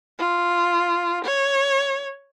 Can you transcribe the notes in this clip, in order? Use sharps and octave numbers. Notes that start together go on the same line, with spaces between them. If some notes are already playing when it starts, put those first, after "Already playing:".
F4
C#5